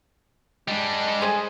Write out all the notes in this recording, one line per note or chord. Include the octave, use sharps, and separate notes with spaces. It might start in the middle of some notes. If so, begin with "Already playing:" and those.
G3 G#3 D4
G#4 C5 D#6